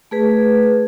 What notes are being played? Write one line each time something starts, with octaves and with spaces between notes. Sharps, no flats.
A3 G#4 B4